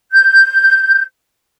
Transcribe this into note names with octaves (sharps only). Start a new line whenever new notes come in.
G6